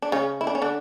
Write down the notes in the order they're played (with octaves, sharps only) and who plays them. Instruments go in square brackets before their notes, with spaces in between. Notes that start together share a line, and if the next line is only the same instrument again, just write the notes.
[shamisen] D4
C#3 C#4
E4
D4
C#4
D3 D4